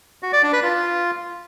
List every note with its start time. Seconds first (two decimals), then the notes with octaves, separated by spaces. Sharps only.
0.23 F#4
0.33 D5
0.43 D4
0.53 B4
0.63 F4